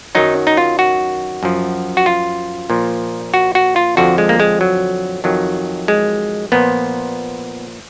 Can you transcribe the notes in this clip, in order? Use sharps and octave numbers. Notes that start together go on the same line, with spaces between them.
F#2 D#3 F#3 D#4
D#4
F4
F#4
F#2 F3
F#4
F4
A#2 F3
F#4
F#4
F4
F2 D3 F3 F#4
G#3
A#3
G#3
F#3
F2 D#3 F#3
G#3
A#2 F3 B3